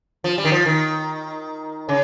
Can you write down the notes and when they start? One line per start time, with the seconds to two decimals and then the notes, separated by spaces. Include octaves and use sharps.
0.24 F3
0.38 G3
0.44 D#3
0.52 F3
0.66 D#3
1.89 C#3